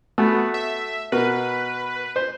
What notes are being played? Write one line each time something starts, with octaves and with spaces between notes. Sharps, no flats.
A3 B3 F#4
E5
B2 A#4 B4
C5